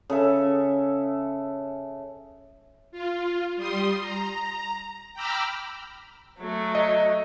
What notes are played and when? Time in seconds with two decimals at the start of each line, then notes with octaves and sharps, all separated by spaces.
0.10 C#3 A4 E5
2.92 F4
3.57 G3 C6 D#6
4.01 A#5
5.14 G5 A#5 B5 D6 E6 F6
6.39 F#3 A3
6.75 D#5